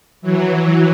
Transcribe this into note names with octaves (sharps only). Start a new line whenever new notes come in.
E3 F#3